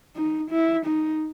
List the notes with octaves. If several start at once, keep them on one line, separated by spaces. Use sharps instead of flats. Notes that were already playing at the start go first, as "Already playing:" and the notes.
D#4
E4
D#4